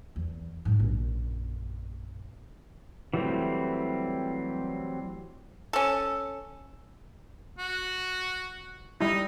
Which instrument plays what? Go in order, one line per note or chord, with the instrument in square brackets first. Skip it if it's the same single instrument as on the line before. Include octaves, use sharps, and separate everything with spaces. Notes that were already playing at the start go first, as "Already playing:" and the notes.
[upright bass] E2
G#2 G3
A#1 F#2
[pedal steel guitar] E3 F#3 G3 A3 C4
[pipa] C#4 A4
[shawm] F#4
[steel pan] G3 E4 [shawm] D#4